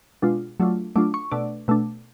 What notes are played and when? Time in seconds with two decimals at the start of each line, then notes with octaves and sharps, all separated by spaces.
0.22 B2 G#3 D4 F4
0.60 F#3 A3 D4 F4
0.96 F#3 A3 D4 F4 D6
1.14 C#6
1.31 B2 A3 D4 D5
1.68 B2 A3 D4